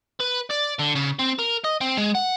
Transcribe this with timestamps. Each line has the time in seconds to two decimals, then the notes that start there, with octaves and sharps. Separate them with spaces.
0.20 B4
0.51 D5
0.79 D3
0.96 C#3
1.19 C4
1.39 A#4
1.64 D#5
1.81 C4
1.97 G#3
2.15 F#5